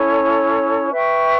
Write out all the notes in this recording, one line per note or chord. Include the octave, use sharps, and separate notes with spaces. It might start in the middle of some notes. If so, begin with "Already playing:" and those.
Already playing: C#4 E4 A4 C#5
B4 E5 G5 C#6